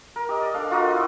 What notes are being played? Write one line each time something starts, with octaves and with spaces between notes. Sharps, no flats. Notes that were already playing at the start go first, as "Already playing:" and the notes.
A#4
G4 D#5
D5
D4 A4 F5 D6
F4 F#4 A#4 D#5
E4 F#4